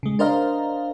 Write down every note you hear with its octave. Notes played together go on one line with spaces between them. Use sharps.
C#3 G#3
D4 A#4 C5 D#5 F5 A#5